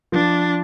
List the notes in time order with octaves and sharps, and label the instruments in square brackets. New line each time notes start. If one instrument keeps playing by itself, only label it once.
[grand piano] F3 [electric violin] D4